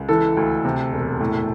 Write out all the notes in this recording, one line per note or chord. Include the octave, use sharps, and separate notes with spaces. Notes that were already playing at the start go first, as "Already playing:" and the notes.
Already playing: C#2
E3 A4
D2
C3
E1
A2